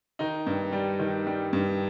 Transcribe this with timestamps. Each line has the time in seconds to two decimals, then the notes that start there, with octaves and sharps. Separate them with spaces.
0.19 D#3 D#4
0.47 G2
0.72 G3
1.00 D#3
1.27 G3
1.53 G2